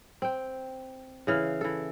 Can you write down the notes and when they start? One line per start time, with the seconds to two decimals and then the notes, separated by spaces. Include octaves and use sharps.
0.22 C4 G5
1.27 C#3 E3 F5
1.61 E3 A4